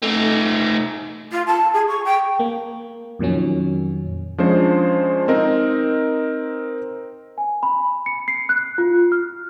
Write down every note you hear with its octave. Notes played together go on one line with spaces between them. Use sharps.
A3 D#4
F4
A5
G#4
C#6
G5
A#3
F2 A#2 D#3 F#3 C#4
F3 G#3 C#4 D4 C5
C4 D#4 A#4 D#5
G#5
B5
C#7
C7
F#6
F4
F6